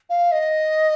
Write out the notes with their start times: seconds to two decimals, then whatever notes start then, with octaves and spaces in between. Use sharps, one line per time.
0.10 F5
0.32 D#5